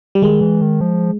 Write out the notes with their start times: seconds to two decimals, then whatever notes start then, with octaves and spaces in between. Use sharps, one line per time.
0.15 G3
0.22 D#3 G#3
0.41 E3
0.61 D#3
0.81 F3